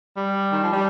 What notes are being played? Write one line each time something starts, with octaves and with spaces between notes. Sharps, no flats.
G3
D#3
F3
G3